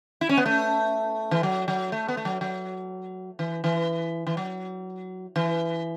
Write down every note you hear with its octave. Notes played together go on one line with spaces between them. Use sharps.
E4
C#4
B3
A3
E3
F#3
F#3
A3
B3
A3
F#3
F#3
E3
E3
E3
F#3
E3